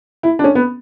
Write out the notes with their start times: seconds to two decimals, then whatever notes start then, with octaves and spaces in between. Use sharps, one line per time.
0.23 E4
0.39 D4
0.44 C#4
0.55 B3